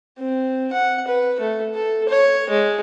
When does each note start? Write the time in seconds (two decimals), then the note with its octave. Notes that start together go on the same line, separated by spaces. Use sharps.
0.18 C4
0.72 F#5
1.07 B4
1.40 A3
1.74 A4
2.09 C#5
2.50 G#3